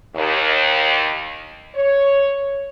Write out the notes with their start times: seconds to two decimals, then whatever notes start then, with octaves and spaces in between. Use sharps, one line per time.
0.16 D#2
1.74 C#5